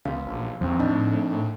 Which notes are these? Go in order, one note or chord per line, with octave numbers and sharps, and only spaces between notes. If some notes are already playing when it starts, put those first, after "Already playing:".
C#2 B3 F5
A#1
E2 F3 C4
A2 D4 D#4 D#5